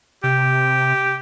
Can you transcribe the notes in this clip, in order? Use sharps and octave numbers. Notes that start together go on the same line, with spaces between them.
C3 G4